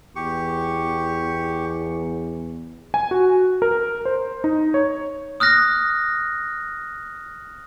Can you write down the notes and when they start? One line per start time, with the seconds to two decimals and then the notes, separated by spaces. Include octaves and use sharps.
0.16 E2 G4 C#6
2.94 G#5
3.11 F#4
3.62 A#4
4.05 C5
4.44 D#4
4.74 C#5
5.40 D#6 F6 F#6 A#6